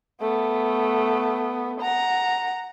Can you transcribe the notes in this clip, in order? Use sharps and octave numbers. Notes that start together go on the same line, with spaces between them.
A3 B3
F#5 A#5